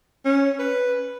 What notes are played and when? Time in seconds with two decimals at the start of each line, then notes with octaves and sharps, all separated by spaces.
0.25 C#4
0.59 B4